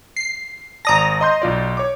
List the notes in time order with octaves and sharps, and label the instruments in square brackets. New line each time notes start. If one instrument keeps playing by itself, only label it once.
[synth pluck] C7
[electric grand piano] G#1 D5 A5 [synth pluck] A#5 D#6 A#6
[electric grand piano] D#5 C6 G6
B1 F4 D5
C#5 D6